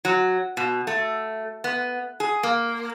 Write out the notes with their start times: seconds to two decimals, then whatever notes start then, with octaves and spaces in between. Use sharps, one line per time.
0.05 F#3
0.57 B2
0.87 A3
1.64 B3
2.20 G#4
2.43 A#3